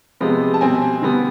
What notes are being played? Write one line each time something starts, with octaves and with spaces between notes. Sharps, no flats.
C3 F3 G#3 B3
A5
B2 G3 C4 G#5
D3 G3 B3